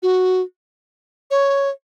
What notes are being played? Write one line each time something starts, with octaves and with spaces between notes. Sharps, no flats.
F#4
C#5